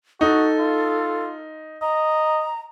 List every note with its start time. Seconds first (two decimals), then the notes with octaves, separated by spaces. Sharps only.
0.21 D#4 F#4 A4
0.59 F4
1.82 D#5 A#5